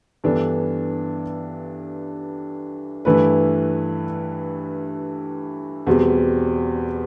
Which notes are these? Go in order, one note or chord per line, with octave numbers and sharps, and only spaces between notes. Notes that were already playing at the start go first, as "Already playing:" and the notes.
G2 E3 B3 D4 A4
G2 E3 A3 E4 B4
E2 B2 G3 C4